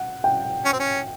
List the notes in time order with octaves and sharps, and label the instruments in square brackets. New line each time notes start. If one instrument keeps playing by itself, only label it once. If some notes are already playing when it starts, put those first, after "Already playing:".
Already playing: [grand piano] F#5
G5
[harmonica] C#4
C4
C#4